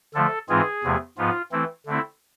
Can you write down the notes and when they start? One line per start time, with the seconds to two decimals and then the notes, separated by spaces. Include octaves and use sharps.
0.14 D3 F3 A3 A4
0.49 G#2 E3 G#3 C4 F4 G#4
0.83 E2 C3 F3 A3
1.18 G#2 F3 B3 F4
1.52 E3 A3 C4 E4
1.86 D3 A3 C4 E4